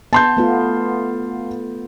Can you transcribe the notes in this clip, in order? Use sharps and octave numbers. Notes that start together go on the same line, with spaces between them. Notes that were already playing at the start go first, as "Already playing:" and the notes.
B3 A5 C6 G6
A3 B3 F4